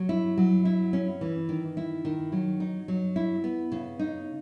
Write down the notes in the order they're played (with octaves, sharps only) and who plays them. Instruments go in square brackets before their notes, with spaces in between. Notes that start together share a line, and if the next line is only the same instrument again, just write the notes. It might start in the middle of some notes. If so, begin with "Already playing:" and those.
Already playing: [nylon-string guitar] F#3
E4
F#3
E4
C#4
E3
D#3
E4
D#3
F#3
D#4
F#3
E4
B3
C#3
D#4